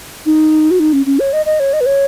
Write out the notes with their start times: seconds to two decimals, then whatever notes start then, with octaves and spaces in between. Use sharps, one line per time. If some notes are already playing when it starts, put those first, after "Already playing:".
0.26 D#4
0.71 F#4
0.79 D#4
0.93 C#4
1.06 C#4
1.19 C#5
1.33 D#5
1.46 D#5
1.60 C#5
1.73 D#5
1.81 B4
1.86 C#5